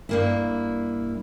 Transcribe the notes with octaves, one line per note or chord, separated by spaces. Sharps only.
G2 A#3 E4